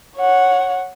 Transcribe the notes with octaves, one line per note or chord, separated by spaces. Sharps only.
C#5 F#5